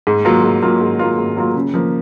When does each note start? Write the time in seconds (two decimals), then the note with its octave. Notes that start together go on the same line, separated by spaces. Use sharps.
0.07 G#2
0.25 F#3 A#3 F4
0.43 G#2
0.62 F#3 A#3 F4
0.81 G#2
0.99 F#3 A#3 F4
1.18 G#2
1.37 F#3 A#3 F4
1.55 C#3
1.74 F3 A#3